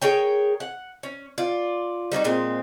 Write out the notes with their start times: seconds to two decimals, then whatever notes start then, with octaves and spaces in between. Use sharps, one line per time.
0.02 G#4 A#4 C#5 G5
0.60 F#5
1.03 C#4
1.38 F4 D5
2.12 G3 D#4 E4 F#4
2.24 A#2 G#3 C4